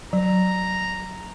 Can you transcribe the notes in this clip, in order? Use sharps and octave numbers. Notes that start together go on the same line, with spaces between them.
F#3 A#5